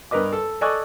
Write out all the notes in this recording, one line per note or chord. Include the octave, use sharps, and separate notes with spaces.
G2 A#4 B4 D#5 D6
A4
A4 D5 D#5 G#5 C#6 F#6